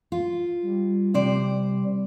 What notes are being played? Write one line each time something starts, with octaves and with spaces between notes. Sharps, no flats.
F4
G3
C3 G3 C5 D5